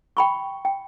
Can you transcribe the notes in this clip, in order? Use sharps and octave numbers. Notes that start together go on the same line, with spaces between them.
G5 B5 C#6
G5